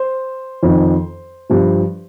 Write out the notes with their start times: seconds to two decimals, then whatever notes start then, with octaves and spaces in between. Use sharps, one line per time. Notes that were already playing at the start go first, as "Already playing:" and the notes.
Already playing: C5
0.63 F2 D#3
1.50 G2 F3